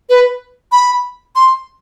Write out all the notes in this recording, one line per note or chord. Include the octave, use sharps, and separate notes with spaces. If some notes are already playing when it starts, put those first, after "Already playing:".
B4
B5
C6